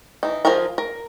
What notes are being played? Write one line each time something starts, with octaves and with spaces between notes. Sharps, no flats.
E3 D#4
F3 F4 G#4 A#4 A#5
A#4